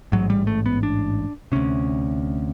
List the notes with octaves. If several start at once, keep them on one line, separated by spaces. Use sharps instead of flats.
A1 G#2 F#3
G3
A3
B3
D4
D2 C3 C#4